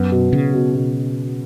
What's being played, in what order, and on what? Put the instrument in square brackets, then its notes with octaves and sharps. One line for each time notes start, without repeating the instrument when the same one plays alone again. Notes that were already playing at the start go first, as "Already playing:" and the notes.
Already playing: [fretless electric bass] F#2 [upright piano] B3
[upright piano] B2
[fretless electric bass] C#3 [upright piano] F#3
[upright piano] B2
B2